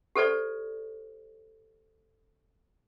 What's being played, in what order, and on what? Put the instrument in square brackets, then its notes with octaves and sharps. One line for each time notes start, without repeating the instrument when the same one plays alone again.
[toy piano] G4 A4 C5 D5